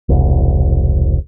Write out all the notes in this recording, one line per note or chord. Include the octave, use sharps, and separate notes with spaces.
E1 C2